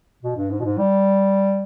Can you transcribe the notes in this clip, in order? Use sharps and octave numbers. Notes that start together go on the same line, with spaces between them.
B2
G2
G#2
B2
G#2
G3